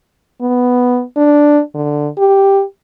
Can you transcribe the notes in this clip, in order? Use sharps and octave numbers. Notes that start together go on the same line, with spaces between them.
B3
D4
D3
G4